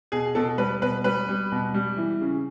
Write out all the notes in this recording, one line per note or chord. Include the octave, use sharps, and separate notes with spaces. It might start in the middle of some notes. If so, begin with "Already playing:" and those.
B2 G#4
B2 A4
G3 B4
B2 B4
G3 B4
G3
B2
G3
E3
C#3